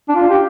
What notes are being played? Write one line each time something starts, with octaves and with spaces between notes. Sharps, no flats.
D4
F4
G4